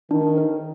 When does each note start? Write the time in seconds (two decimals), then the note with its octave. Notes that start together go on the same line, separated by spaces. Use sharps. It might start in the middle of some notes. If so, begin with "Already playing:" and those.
0.11 D#3 D4
0.38 A#4